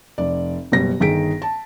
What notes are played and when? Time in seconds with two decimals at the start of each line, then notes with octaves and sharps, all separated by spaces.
0.18 F1 D5
0.72 F#1 B2 G3 A#6
1.00 G1 D#3 G#4 B6 D7
1.42 A5